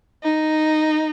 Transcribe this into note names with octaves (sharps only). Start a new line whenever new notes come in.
D#4